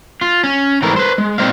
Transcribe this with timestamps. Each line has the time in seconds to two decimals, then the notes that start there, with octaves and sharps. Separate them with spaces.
0.21 F4
0.44 C#4
0.82 G#2 E3 A3 A#4
0.96 B4 C5
1.18 G#3
1.38 A#2 C4 C5 D#5 F5